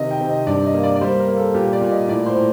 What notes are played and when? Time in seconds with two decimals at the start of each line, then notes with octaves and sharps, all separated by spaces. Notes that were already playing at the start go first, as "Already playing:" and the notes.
Already playing: C3 D#3 D#5
0.11 G5
0.21 C3
0.29 D#5
0.47 G2 D5
0.66 D#5
0.74 A#3
0.83 D5
0.96 D5
1.01 G3 C5
1.20 A#4
1.28 A#3
1.37 A4
1.54 A#2 G4
1.73 D5
1.81 A#2
1.91 D#5
2.08 A2 D5
2.26 C5
2.36 A2